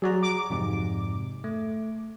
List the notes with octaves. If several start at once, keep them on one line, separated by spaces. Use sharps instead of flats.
F#3 G#4 D5 A#5
D6
F2 G#2 C3
A3